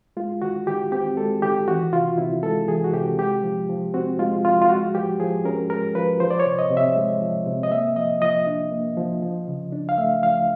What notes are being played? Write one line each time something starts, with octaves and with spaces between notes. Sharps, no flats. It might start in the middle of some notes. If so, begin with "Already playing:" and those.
G#3 F4
D#3 F#4
D#3 G4
C4 G4
G#3 A4
D#3 G4
E3 F#4
C3 F4
C3 E4
G#3 A4
E3 G#4
F#4
C3 G4
G#3 G4
F3
F3
C4 F#4
G#3 F4
F3 F4
F4
G#3 F#4
F3 G4
F3 G#4
C#4 A#4
G#3 A#4
F3 B4
F3 C5
D5
C#5
C3
D#5
C3
E5
G#3
F3
C3
D#5
A#3 E5
F3 D#5
F3 D#5
D4
A#3
F3
F3
C#3
D4
F5
A3 E5
F3 F5